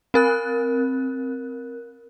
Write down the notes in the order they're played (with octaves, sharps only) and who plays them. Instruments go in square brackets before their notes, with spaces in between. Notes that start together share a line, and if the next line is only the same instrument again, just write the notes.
[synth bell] C4 A#4 F#6